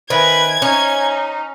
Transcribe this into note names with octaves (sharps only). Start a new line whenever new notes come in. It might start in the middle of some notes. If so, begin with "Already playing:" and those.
D#3 B4 C5 E5 G#5 G#6
C#4 D#4